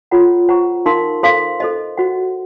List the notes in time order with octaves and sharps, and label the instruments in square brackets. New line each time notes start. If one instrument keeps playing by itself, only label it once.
[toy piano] F4 A4 C#5 F#5 A#5
C5 F#5 A#5 C#6
D#4 A#4 F5 C6
A4 C5 F5 C6
A4 C5 D#5
F#4 C5 D#5 F#5